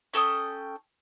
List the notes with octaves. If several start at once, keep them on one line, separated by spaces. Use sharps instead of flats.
C#4 A4 G5 D#6